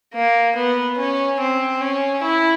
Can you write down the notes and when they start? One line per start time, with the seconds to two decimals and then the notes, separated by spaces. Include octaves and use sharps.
0.14 A#3
0.56 B3
0.97 C#4
1.40 C4
1.81 C#4
2.23 E4